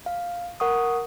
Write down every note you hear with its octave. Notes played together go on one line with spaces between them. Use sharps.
F5
A#4 F#5 C#6 D#6